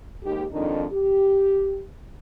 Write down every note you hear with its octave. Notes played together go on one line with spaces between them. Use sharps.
D#2 G#2 G4
F2 G#2 D#3 D4 D#4
G4